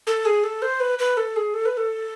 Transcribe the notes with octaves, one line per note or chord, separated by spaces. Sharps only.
A4
G#4
A4
C5
B4
B4
A4
G#4
A4
B4
A4